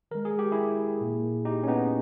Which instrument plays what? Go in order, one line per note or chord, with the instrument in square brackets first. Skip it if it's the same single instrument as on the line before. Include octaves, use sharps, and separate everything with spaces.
[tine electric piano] D#3 G#3 A#4
G#4
G4
E4 G#4
A#2 A#3
D#4 G4
C#4
B3 D#4